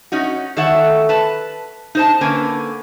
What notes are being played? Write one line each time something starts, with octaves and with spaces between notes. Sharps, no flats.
C#4 D#4 F#4
D#3 A4 C#5 E5 F#5
B4 A5
D#4 C5 A5
D3 A#3 C#4 B4 G#5